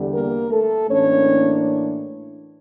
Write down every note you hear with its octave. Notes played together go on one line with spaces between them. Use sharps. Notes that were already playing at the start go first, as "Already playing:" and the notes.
Already playing: E2 D3 G3
A#3 A#4
A3 A4
A2 E3 A#3 C#4 D4 C#5